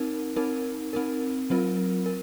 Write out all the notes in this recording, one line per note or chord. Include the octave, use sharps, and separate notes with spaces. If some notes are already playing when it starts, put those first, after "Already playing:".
Already playing: C4 D#4 A#4
C4 D#4 A#4
C4 D#4 A#4
F#3 C4 F4 A#4
A#4